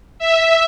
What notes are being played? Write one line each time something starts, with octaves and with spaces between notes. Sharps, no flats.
E5